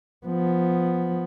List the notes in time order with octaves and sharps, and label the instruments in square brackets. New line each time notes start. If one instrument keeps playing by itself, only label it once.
[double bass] F3 B3